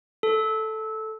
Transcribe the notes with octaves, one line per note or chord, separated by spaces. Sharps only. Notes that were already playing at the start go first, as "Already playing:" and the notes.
A4